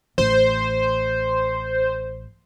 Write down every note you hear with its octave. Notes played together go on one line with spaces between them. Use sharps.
A1 C5